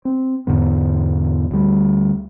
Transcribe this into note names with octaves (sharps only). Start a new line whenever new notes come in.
C4
E2 G#2 D3 B3
D2 G3